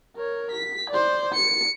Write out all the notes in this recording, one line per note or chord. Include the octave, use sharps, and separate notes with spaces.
A#4 C#5
B6
C5 D5
C#7